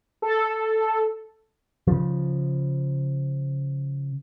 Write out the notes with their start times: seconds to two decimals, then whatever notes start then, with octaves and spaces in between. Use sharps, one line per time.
0.22 A4
1.87 C#3 F3